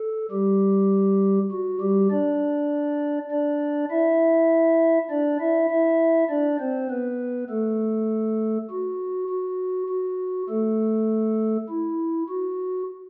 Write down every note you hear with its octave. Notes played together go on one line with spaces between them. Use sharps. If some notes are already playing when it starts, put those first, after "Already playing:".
Already playing: A4
G3 G4
F#4
G3 G4
D4 D5
D4 D5
E4 E5
D4 D5
E4 E5
E4 E5
D4 D5
C4 C5
B3 B4
A3 A4
F#4
F#4
F#4
A3 A4
E4
F#4